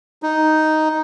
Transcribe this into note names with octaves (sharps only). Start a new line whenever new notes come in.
D#4